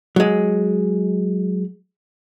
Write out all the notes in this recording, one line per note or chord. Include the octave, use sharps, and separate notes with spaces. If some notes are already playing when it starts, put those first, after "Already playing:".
F#3 G#3